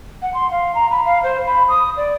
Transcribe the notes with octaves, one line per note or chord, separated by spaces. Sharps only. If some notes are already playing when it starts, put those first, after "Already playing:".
F#5
C6
F5
A#5
B5
F5
C5
B5
D#6
D5